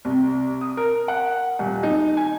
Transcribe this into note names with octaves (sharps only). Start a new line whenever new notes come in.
C2
D#6
A#4
F#5
D#1
D#4
G#5